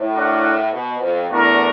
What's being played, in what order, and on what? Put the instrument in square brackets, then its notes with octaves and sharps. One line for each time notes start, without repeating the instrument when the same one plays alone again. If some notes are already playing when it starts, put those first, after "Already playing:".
Already playing: [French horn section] A2
[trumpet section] D4 F#4 A#4 C#5 F#5
[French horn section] B2
F2
[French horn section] E2 [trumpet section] A3 D4 F#4 A#4